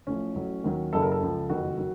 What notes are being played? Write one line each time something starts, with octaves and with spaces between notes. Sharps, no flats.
A1 A2 F3 C#4
A1 A2 F#3
D#2 D#3 F#3
F#1 F#2 C#3 F#3 A4
A#4
A4
C#2 C#3 F3
F#1 F2 D#3 F#3 F#4
D#3 F#3